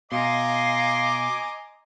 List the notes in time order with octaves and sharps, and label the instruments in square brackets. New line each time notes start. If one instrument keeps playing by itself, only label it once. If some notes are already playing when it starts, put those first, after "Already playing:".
[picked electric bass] B2 [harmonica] D#5 G#5 D6 [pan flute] F5 [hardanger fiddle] A#5 C6